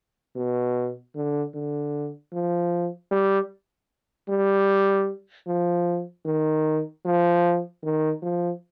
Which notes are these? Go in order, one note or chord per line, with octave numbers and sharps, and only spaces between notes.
B2
D3
D3
F3
G3
G3
F3
D#3
F3
D#3
F3